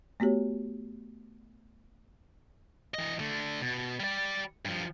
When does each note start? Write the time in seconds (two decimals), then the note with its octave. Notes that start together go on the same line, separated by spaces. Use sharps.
0.20 A3 B3 F#4 G4 C#5
2.94 E3 D#5
3.19 D3 A3
3.62 B2
4.00 G3 D5
4.65 G2 F3